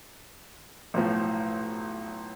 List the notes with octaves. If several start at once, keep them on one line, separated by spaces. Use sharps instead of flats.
B1 A2 F3